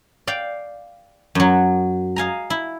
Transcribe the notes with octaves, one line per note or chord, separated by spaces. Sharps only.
D5 F5 G5
F#2 F#3
D#5 F5 G#5 A#5
E4